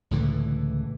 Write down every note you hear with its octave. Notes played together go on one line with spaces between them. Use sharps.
C#2 A2 D3 E3